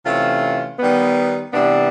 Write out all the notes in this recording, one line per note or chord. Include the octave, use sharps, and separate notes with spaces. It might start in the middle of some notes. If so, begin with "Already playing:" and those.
C3 E3 A3 C#4 F4
D#3 G3 B3
C3 E3 G3 B3 D4